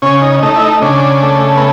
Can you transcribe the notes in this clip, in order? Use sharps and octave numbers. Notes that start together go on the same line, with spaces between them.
C#3 C#4
D#4
A3 D#4
E4
D#4
C#3 D4
A3
B3